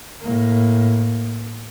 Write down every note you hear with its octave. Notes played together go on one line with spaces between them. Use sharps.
A2 A#3